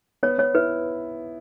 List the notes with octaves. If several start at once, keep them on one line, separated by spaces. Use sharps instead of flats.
B3 C#5
B3 C#5
E4 B4